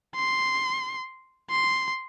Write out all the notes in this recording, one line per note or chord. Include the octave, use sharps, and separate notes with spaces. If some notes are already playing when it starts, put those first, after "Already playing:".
C6
C6